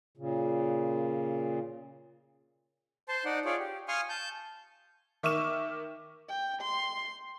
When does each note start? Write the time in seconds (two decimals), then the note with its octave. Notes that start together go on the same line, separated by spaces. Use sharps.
0.18 A#2 C#3
3.09 C5 A5 C6
3.25 D#4 D5 F#5
3.45 F4 G#4 C#5 D5
3.59 G4
3.88 F5 G#5 C6 C#6 D#6 F6
4.09 A5 G6
5.23 D#3 E5 C#6 D6 F6 E7
6.29 G5
6.62 C6